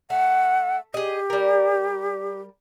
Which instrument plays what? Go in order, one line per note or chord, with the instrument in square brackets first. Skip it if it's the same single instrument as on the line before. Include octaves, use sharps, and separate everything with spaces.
[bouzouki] A3 [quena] F#5
[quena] G4 [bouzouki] G#4 D#5
[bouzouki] G3 A#4